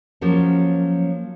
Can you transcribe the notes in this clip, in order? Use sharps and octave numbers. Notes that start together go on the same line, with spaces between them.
F3 F#3 A#3 C#4